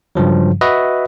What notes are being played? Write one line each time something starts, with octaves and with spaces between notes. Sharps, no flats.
G2 C#3 F3 F#3
F#4 B4 D#5 E5